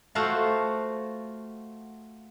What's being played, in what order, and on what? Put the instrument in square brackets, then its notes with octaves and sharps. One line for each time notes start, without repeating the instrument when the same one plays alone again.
[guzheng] A3 F4 F#4 C5 F5 F#5